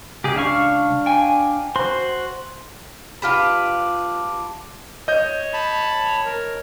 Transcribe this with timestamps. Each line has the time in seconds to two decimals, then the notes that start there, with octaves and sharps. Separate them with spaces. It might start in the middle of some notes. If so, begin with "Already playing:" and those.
0.24 C#2 G4 G#4
0.36 D4 F5 C#6
1.06 G5 G#5
1.76 F#4 C5 C6
3.22 D4 F4 G4 B4
5.08 C#5 D#5 G6
5.54 A5 B5
6.25 A#4